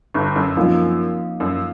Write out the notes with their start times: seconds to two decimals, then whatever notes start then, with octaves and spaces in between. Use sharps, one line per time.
0.14 G1 G2
0.36 F#2
0.56 F#2 F3 A#3 D#4
1.40 F#2